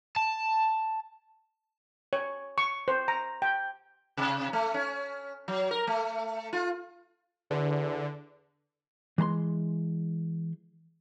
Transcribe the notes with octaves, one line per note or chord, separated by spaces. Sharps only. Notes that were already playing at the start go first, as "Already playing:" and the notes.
A5
C#5
C#6
C5
A#5
G5
C3
A3
C#4
F#3
A#4
A3
F4
E2 D3
E3 G#3 A#5 C6